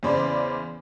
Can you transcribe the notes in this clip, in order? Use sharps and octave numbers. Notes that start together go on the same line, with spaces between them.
E2 C#3 C5 D5 B5